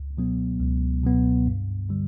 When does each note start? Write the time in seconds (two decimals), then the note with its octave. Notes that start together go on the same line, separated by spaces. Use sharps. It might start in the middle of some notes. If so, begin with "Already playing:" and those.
Already playing: C#2
0.17 B2 F#3 B3
0.60 C#2
1.03 B2 F#3 B3
1.47 G2
1.89 D3 G3